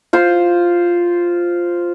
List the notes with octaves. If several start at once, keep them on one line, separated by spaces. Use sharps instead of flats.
F4 C5